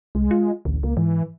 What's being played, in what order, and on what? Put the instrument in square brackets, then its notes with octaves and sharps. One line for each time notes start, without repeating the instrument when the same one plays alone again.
[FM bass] C2 [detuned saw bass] G#3
[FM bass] F4
[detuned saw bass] A1 [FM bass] D2
[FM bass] C#2 [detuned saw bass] A#3
[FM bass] G#2 [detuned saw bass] E3